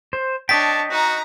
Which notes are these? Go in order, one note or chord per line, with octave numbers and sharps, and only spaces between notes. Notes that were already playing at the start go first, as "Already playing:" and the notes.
C5
D4 C#5 D#5 G5 A5 B6
D#4 F#4 A#5